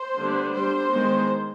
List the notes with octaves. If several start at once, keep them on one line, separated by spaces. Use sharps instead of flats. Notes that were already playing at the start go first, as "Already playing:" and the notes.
Already playing: C5
D3 G3 B3 D4
G3 C5
D4
D#3 G#3 B3